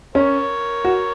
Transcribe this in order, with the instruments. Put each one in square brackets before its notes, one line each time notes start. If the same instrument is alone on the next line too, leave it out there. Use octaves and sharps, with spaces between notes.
[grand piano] C#4 [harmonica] A#4 C#5
[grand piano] F#4